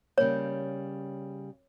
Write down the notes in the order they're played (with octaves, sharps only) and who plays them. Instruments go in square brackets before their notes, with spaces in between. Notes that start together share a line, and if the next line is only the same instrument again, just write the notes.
[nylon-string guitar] C#3 G3 A#3 [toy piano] C#5